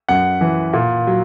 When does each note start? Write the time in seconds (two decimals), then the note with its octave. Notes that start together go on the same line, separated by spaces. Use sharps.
0.09 F#2 F#5
0.41 E3
0.73 A#2
1.07 F#3